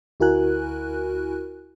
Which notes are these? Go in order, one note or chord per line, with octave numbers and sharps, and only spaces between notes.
D2 E4 F#4 A#4 G#5 F#6